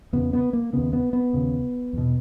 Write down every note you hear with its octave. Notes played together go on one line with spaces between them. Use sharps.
E2 C#3 B3
B3
A#3
D#2 C#3 B3
B3
B3
D#2 C#3
E2 B2